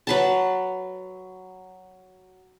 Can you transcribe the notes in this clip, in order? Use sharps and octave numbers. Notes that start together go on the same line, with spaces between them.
F#3 B4 A5